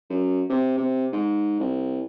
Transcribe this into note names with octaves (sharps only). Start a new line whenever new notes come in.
F#2
C3
C3
G#2
C2